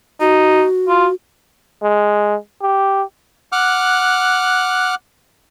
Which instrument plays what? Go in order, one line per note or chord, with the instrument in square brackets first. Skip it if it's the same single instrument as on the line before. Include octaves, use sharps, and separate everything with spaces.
[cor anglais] D#4 [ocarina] F#4
[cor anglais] F4
[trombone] G#3
G4
[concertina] F#5 D6 F6 F#6